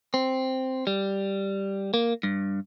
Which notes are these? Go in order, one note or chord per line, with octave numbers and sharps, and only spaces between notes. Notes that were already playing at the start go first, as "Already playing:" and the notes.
C4
G3
A#3
G2